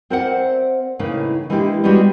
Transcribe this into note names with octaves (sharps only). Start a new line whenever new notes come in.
C4 A#4 C5 D5 E5 F#5
A2 C#3 E3 A#3 D#4
E3 G#3 A#3 D4 E4 G4
G3 G#3 B3 C#4 F#4 G4